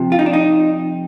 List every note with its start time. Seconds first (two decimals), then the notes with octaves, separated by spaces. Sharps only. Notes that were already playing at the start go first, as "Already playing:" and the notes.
Already playing: C3 F3
0.12 F4
0.19 D#4
0.26 D4
0.33 D#4